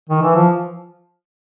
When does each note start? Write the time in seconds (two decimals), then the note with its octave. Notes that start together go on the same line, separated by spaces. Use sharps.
0.09 D#3
0.22 E3
0.35 F3